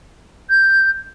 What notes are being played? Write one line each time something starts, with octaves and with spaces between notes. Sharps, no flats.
G6